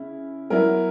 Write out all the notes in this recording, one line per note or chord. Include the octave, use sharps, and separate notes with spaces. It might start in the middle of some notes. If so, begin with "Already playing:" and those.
Already playing: C#3 E4
F#3 B3 E4 A#4